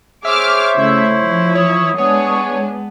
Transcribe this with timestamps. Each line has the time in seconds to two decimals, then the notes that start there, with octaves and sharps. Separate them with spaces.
0.25 G#4 C5 C#5 E5 D6 F6
0.77 C#3 A3 E4
1.22 F3
1.55 C#5 D#6
1.98 G#3 B3 D4 G#4 C#5